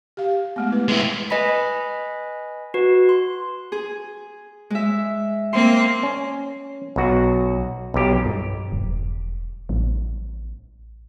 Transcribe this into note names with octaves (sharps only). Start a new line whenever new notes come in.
G4 F5
G#3 A3 B3
E4 B4
G#3 E4 B4
B4 D#5 G#5 B5 B6
F#4 B4
C6
G#4
G#3 E5
A#3 C4 C6
C#4
B1 F#4
B1 G4
G2
E1
A1